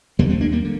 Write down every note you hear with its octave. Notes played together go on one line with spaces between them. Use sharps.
D#2 D3 G3 A#3
A3 C4
A#3 D4
G3 A#3
D3